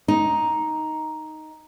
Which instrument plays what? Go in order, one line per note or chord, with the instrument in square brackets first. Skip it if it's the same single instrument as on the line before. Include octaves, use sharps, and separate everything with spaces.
[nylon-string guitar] D#4